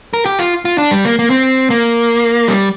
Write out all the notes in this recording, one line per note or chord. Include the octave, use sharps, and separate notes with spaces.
A#4
G4
F4
F4
D4
G3
A#3
A#3
C4
A#3
G3